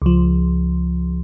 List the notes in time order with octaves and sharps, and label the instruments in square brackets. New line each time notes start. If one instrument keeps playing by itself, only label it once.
[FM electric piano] C#2 F3